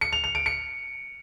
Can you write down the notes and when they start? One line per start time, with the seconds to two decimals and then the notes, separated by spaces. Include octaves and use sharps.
0.01 C#7
0.13 F7
0.24 F7
0.35 D7
0.46 C#7